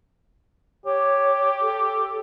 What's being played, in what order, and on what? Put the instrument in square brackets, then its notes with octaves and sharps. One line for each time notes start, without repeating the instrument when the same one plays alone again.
[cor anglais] G4 [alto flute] C#5
[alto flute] A4